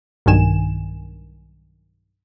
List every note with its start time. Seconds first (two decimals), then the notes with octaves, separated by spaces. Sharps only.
0.26 B1 G2 D#3 G#5 E7